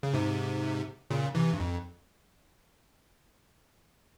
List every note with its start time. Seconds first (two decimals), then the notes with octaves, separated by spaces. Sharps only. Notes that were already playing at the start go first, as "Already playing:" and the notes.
0.03 C#3
0.14 G#2 C3
1.10 A#2 C#3
1.35 C3 E3
1.53 G2
1.60 F2